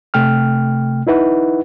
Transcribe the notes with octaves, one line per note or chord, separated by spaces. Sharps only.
C3 A3 G5 F6
D#4 E4 B4 F#5